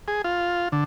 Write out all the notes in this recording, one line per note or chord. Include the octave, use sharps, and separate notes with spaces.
G#4
F4
D3